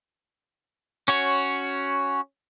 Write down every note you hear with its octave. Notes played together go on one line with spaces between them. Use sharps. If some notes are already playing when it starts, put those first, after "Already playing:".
C#4 F#4 C#5